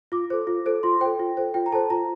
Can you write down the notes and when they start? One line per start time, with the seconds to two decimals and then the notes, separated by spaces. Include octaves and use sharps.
0.12 F4 D6
0.30 A4 C5
0.47 F4
0.66 A4 C5
0.83 F4 C6
1.01 A4 C5 G5
1.19 F4
1.37 A4 C5
1.54 F4 G5
1.66 A#5
1.72 A4 C5 A5
1.90 F4 A#5